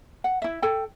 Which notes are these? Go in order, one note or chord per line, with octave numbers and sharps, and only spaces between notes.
F#5
E4 E5
A4 G5